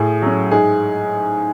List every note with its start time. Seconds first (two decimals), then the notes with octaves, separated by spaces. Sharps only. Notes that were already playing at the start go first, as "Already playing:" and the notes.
Already playing: A2 G#4
0.22 F#3 C#4
0.51 G#2 G#4